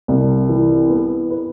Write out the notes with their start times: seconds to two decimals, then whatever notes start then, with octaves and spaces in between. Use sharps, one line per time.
0.08 C2
0.49 E3
0.90 B3
1.30 B4